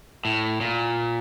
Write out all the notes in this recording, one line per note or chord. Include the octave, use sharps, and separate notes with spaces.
A2
A#2